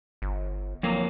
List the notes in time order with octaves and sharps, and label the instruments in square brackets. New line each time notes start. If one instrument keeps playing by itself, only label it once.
[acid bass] G1
[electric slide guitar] F2 A#3 [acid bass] F#3